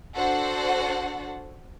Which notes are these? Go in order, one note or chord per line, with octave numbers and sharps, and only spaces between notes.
D4 F#4 A4 C5 F#5